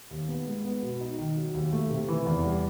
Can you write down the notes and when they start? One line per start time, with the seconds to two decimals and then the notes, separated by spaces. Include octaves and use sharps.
0.11 D#2
0.28 B3
0.47 G#3
0.65 B3
0.83 B2
1.01 D#4
1.18 D#3
1.37 F#3
1.54 D#2
1.73 A3
1.90 C3
2.08 E3
2.26 E2
2.45 G3